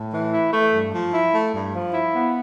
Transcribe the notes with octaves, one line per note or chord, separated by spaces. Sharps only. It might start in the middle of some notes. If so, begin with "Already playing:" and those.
Already playing: A2
E3
E4
A3
G2
F3
E4
A3
G2
F3
E4
B3